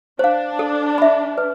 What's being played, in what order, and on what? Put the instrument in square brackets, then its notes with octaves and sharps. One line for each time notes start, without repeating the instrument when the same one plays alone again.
[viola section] D4 [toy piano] C5 F5
[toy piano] A4
E5 B5
B4